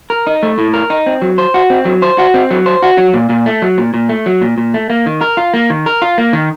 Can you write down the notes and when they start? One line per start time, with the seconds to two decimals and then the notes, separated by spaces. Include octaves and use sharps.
0.10 A#4
0.27 D#4
0.43 A3
0.58 A2
0.73 A#4
0.90 D#4
1.06 C4
1.22 F#3
1.38 C5
1.54 F#4
1.70 C4
1.85 F#3
2.02 C5
2.18 F#4
2.34 C4
2.51 F#3
2.66 C5
2.83 F#4
2.98 F#3
3.14 A#2
3.29 A#2
3.46 A3
3.62 F#3
3.78 A#2
3.94 A#2
4.09 A3
4.26 F#3
4.41 A#2
4.58 A#2
4.74 A3
4.90 A#3
5.06 D#3
5.21 A#4
5.37 F4
5.54 A#3
5.70 D#3
5.86 A#4
6.02 F4
6.18 A#3
6.33 D#3